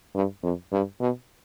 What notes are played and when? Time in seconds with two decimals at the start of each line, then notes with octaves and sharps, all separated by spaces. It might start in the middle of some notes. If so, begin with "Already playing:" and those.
0.15 G2
0.43 F2
0.72 G2
1.01 B2